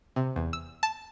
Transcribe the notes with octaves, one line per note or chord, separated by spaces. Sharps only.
C3
E2
E6
A5